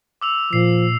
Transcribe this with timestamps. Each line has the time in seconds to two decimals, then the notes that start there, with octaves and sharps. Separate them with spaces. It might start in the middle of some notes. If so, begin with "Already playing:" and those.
0.21 D6 E6 F7
0.53 A#2 F3 C7